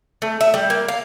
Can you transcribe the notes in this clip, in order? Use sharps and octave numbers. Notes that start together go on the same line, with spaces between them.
A3
E5
G3
A#3
F5